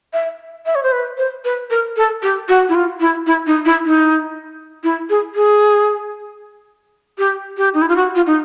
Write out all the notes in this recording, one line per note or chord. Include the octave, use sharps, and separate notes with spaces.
E5
E5
C#5
C5
B4
C5
B4
A#4
A4
G4
F#4
E4
F4
E4
E4
D#4
E4
D#4
E4
G#4
G#4
G4
G4
D#4
E4
F4
F#4
F4
D#4